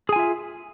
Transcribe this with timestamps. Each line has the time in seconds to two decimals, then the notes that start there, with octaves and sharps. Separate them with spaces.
0.09 G#4
0.13 G#5
0.16 F4
0.19 E5